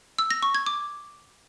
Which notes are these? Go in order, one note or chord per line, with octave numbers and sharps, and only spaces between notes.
E6
A#6
C#6
G#6
D6